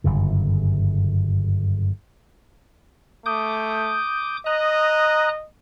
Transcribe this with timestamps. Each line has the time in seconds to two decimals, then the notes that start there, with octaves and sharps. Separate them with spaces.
0.04 G1 F#2 C#3
3.26 A3 D6 D#6 G6
4.46 D#5 A#5 D#6 F#6